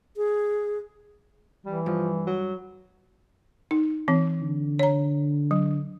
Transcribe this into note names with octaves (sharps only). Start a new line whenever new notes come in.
G#4
E3 G3
G2 F3
F#3
D#4
E3 C4
D3
C#5 A#5
F#3